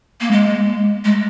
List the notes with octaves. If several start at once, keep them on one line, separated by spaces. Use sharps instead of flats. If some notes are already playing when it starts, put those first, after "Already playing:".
A#3
G#3
G#3